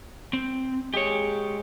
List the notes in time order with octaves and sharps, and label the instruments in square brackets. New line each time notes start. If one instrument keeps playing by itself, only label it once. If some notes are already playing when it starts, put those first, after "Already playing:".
[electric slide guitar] C4
[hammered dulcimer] G#3 [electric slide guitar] G4 C#5